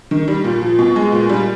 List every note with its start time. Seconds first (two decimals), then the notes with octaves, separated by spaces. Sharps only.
0.11 D#3
0.28 G3
0.44 A#2
0.62 F3
0.79 B2
0.96 G#3
1.12 A#2
1.29 G3